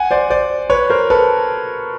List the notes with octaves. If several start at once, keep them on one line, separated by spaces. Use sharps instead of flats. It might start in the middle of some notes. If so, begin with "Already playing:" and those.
Already playing: F#5 G#5
C5 D5
C5 D5
B4 C#5
A#4 C5
A4 B4